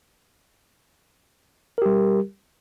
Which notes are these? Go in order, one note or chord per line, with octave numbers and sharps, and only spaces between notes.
G3 G4 A#4